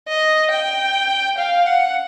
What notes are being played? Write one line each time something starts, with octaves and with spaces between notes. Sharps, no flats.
D#5
G5
F5
F#5